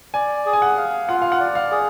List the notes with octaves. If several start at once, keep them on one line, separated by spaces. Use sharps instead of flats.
D5 G#5
G#4
G#5
F#5
F5
F4 F#5
F5
F#5
D5
F5
G#4